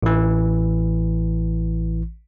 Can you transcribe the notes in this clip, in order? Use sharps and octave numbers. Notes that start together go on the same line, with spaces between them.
A1 E3